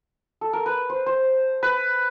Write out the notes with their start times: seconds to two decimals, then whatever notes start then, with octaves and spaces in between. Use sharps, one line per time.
0.41 A4
0.53 A#4
0.66 B4
0.90 C5
1.06 C5
1.63 B4